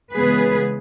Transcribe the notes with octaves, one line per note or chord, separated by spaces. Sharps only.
C#3 E3 G#3 B3 G#4 B4